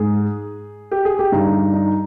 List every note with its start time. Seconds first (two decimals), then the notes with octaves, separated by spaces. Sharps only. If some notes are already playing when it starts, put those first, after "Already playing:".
Already playing: G#2 G#4
0.92 G4
1.05 G#4
1.19 G4
1.32 G2 D3 D#4
1.74 D#4